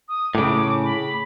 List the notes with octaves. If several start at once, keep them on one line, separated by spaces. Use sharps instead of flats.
D#6
A2 C#3 D6
B5